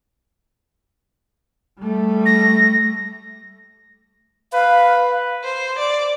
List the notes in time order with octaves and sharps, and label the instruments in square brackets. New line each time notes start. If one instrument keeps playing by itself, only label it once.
[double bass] G3 A3
[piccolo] A#6
[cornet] B4 [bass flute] F5
[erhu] C5
D5